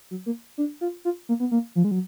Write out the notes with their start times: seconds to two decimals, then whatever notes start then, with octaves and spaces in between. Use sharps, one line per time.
0.11 F#3
0.26 A#3
0.58 D4
0.81 F4
1.05 F4
1.29 A#3
1.40 B3
1.51 A#3
1.76 F3
1.84 G#3
1.91 F#3